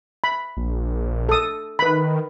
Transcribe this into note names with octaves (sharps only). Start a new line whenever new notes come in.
B5
A#1
A4 D#6
D#3 B4 B5